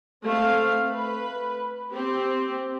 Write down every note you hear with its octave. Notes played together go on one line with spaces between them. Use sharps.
A3 C4 F5
B4
C4 G4